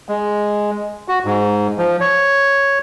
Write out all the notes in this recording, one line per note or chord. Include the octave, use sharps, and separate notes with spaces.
G#3
F#4
G#2
F3
C#5